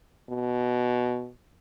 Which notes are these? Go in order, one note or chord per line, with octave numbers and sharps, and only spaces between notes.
B2